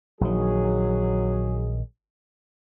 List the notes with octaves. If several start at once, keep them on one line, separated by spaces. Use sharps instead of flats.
A#1 D#3 F#3 G#4